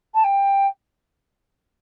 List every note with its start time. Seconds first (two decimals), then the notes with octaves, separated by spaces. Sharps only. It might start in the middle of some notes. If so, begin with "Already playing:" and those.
0.14 A5
0.24 G5